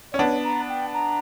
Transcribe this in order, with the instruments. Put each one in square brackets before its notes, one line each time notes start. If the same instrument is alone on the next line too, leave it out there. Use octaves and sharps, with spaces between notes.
[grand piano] C#4 [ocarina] D5
[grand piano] B3 D4 [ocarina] C#5
[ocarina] A#5
G5
A#5